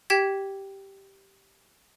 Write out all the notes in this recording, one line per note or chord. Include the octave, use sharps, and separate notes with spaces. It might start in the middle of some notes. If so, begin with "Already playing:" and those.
G4 G5 G#6 B6